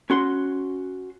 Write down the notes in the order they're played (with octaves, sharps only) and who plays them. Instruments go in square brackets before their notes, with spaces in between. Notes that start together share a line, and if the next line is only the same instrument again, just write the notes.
[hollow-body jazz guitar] C#4 F#4 C6